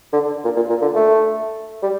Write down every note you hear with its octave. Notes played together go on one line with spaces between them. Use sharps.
D3
A#2
A#2
A#2
D3
A3
G3